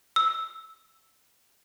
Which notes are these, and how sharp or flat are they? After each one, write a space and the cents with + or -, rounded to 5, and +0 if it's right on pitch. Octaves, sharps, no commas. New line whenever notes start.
E6 -5